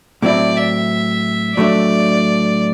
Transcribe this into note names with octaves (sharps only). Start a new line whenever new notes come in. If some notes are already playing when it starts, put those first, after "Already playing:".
A2 F#3 C4 E4 D5
E5
A2 F#3 A3 D4 D5